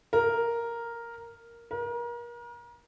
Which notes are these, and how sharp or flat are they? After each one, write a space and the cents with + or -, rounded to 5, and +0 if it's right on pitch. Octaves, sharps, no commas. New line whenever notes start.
A#4 +0
A#4 +35